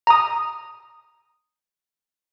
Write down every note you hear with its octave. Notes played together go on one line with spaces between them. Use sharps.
A#5 D#6